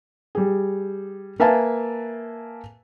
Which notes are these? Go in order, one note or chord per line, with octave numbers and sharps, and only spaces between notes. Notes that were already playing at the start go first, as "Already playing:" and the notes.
G3 G#4
A#3 B4 E5 F5 G#5 A5